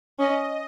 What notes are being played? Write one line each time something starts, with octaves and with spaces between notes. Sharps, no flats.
C#4 D#5